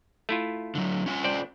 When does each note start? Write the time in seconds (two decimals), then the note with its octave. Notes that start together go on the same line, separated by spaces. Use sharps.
0.29 A3 E4 F4
0.75 D3 F#3
1.06 C#4 F4 G#5
1.24 C5 D5 G5